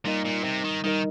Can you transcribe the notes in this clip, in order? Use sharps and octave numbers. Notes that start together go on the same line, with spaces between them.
A#2 G3 D#4 A#4 D#5
A#2
C3
D#3
D#3 G3 D#4 A#4 D#5